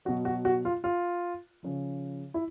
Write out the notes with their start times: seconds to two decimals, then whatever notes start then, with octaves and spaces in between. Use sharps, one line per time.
0.05 B2 F#3 F#4
0.25 F#4
0.45 F#4
0.65 F4
0.84 F4
1.63 C#3 F3
2.34 E4